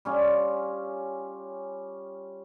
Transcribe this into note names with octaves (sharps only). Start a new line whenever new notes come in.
G3 C#4 F4